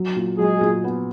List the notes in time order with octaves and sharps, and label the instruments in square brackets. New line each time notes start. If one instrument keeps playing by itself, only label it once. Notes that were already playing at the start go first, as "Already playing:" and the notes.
Already playing: [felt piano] F#3
A#2
[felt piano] F#3 [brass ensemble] G#3 G#4
[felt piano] A#2
B3